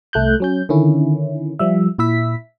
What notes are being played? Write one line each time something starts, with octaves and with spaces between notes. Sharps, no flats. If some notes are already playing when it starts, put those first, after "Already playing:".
C2 A3 F#6 G6
F#3 C#4 G6
D3 D#3 C#4 E4
F3 G3 E5
A#2 E4 E5 B6